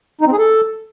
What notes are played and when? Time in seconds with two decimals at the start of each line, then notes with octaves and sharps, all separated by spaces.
0.21 D#4
0.27 C4
0.33 G#4
0.38 A4